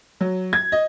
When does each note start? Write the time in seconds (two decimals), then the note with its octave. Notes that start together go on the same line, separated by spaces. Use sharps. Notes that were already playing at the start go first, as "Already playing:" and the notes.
0.21 F#3
0.53 G#6
0.72 D#5